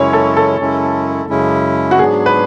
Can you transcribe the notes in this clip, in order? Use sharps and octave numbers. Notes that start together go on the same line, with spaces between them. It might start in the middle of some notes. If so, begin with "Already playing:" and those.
Already playing: F#2 C#3 G#3 C#4 E4 C#5
A4
A4
F#2 C#3 G#3 C#4 E4
F#2 C#3 G#3 C#4 E4
F#4
G#2 F#3 B3 D4 G#4
B4